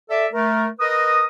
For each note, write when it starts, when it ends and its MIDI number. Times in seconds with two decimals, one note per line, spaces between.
0.10 0.27 69
0.10 0.27 74
0.10 0.27 76
0.33 0.67 57
0.33 0.67 70
0.80 1.25 70
0.80 1.25 71
0.80 1.25 75
0.80 1.25 87